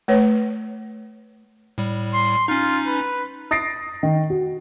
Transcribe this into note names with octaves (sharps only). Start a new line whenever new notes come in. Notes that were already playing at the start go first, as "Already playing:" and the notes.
A3 B4 C#5
A2 G3
C6
C#4 D#4 F4
B4
D#6 A6 A#6 C7 D7
D#3
F#4